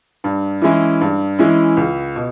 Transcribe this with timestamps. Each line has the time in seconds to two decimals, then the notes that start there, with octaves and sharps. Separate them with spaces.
0.24 G2
0.62 E3 G#3 C#4 E4
1.01 G2
1.39 E3 G#3 C#4 E4
1.77 C#2
2.16 B2